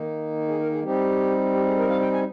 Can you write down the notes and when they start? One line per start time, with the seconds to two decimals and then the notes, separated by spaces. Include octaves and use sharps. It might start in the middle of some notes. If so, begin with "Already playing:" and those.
Already playing: D#3 A#3 D#4
0.48 G#4
0.60 A#4
0.71 G#4
0.83 G3 C4 D#4 G4
1.53 G4
1.65 G#4
1.77 A#4
1.89 F5
2.01 G5
2.12 G#5